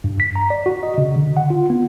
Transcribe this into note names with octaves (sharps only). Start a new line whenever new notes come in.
G2
B6
A#5
D5
F#4
D#5
C#3
D3
F#5
F4
B3